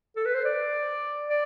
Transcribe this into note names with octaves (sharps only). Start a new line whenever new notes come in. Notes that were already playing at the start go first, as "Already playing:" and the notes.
A4
B4
C5
D5
D5